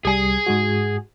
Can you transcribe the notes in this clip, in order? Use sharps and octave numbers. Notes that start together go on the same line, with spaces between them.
C2 G3 G#4 G#5 C7
G#2 G#3 F#4